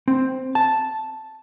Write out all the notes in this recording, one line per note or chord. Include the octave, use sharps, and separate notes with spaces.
C4
A5